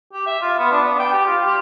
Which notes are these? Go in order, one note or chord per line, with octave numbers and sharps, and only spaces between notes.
G4
E5
F4
B3
D4
B3
G5
G4
F4
G4